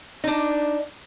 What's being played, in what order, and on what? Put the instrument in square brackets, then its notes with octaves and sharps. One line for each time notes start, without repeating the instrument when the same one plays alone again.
[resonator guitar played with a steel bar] D4 D#4